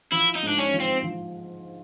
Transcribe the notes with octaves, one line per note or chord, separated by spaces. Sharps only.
F3 E4
D#4
G#2
D4
C#4
F3
C4
F3